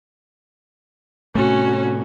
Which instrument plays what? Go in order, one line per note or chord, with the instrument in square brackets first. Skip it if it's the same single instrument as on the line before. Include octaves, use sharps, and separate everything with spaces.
[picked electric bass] A2 C3 A3 [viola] C#4 F#4